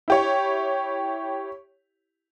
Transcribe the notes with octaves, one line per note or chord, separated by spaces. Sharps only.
E4 G4 C#5